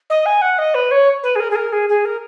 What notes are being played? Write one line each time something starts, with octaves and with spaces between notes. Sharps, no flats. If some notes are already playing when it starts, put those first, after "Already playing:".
D#5
G#5
F#5
D#5
B4
C#5
B4
G#4
A#4
G#4
A#4
G#4
G#4
A#4